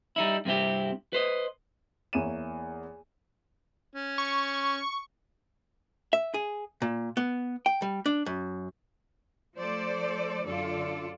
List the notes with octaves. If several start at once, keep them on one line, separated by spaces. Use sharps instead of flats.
G3 D#4 E4
G2 C3 C4 E4 G4
B4 C5 D#5
E2 A#3 E4 C#5 D#7 E7
C#4
C#6
E5
G#4
A#2
B3
G5
G3
D4
F#2
F3 A3 A4 C5 D5
F#2 D3 F4 A4 D5